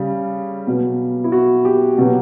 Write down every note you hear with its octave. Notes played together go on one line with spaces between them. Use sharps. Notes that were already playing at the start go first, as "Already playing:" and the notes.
Already playing: C#3 G3
B2 F#3
E4
F#4
G4
B2 F#3